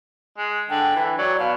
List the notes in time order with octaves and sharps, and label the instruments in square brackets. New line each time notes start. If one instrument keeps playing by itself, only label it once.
[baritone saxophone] G#3
[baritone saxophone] D3 [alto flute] G5
[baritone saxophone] E3
[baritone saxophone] F#3 [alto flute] D5
[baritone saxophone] B2 [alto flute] F5